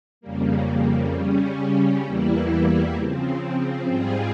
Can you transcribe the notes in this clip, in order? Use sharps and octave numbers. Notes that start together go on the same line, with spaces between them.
F2 C#3 G3 A#3
C#3 G3 C#4
E2 E3 G3 A#3 E4
C#3 F3 C4
G#2 G3 C4 F4 G#4